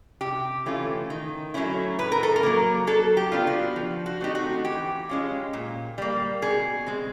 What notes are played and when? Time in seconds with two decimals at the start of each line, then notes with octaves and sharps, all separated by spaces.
0.21 C3 G4
0.66 E3 A3 C#4 F4
1.10 D#3
1.54 F#3 A3 C#4 E4
1.99 A2 B4
2.12 A#4
2.23 A4
2.36 A#4
2.43 F#3 A#3
2.87 F#3 A4
3.17 G4
3.32 B3 D4 F4
3.47 F#4
3.76 F3
4.06 F#4
4.21 A3 C4 D#4 G4
4.35 F#4
4.65 E3 G4
5.09 G#3 C#4 F4
5.53 A#2
5.98 G3 A#3
6.42 B2 G#4
6.86 G#3 C4